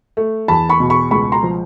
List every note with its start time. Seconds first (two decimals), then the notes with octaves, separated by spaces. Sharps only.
0.17 A3
0.48 E2 A5 B5
0.69 B5 C#6
0.80 B2
0.90 B5 C#6
1.11 C#2 B5 C#6
1.32 A#5 C6
1.43 F3